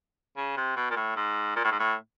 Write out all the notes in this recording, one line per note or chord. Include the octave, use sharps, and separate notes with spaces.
C#3
C3
B2
A#2
A2
G#2
A#2
A2
G#2
A2